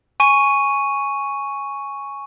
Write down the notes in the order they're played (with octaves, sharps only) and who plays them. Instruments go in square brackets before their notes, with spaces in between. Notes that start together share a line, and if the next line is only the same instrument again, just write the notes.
[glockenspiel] G#5 C#6 D#7